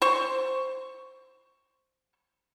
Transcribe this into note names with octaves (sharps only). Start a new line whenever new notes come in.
C5 C#6